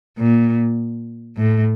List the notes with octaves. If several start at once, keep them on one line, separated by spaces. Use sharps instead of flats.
A#2
A2